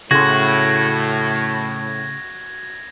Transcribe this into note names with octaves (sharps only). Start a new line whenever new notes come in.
A2 C#3 F#4 C6 G#6 A#6